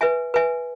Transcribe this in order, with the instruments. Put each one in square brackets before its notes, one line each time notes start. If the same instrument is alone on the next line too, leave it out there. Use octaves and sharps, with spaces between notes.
[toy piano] B4 E5 G#5
B4 E5 G#5